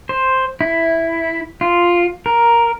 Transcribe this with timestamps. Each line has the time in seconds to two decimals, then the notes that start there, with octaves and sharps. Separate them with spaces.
0.09 C5
0.61 E4
1.61 F4
2.26 A#4